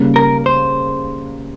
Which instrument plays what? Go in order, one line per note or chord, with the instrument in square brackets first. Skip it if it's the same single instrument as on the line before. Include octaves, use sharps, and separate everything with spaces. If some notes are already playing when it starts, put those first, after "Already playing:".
Already playing: [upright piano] C#3 G3 A#3
[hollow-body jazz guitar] A#4
C5